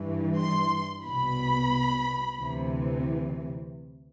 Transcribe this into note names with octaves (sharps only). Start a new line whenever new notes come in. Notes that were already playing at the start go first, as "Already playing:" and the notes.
Already playing: G2 E3
C6
C2 B2 B5
D2 C3 E3